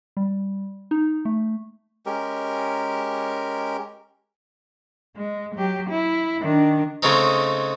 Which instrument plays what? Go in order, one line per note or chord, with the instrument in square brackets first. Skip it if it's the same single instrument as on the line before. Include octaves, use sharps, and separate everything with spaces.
[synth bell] G3
D#4
A3
[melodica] G#3 C#4 G4 A#4
[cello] G#3
F#3 G4
E4
D#3 D4
[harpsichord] C#3 G#3 A3 C4 C#4 D#4